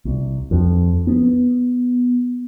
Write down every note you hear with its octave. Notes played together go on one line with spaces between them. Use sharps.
C2
F2
B3